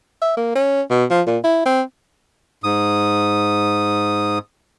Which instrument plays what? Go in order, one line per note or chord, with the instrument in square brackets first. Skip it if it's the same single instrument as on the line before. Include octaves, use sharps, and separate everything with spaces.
[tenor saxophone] E5
A#3
C#4
B2
F3
A#2
E4
C4
[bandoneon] G#2 D#6